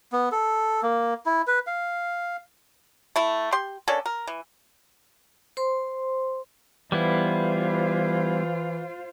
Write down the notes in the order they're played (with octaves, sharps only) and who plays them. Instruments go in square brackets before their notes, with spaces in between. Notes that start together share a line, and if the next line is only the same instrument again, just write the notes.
[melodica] B3
A4
A#3
E4
B4
F5
[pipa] A3 E4
G4 C6
A#3 C#4 D4 A4
A#4
E3
[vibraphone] C5 C6
[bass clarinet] E3 [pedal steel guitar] G3 B3 E4 [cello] F4 C5